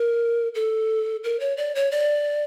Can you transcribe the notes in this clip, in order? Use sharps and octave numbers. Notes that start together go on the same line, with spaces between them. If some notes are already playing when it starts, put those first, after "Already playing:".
Already playing: A#4
A4
A#4
C#5
D5
C#5
D5